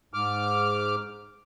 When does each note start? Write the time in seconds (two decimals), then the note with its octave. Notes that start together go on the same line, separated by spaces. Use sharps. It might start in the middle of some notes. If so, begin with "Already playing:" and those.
0.14 G#2 D6 F6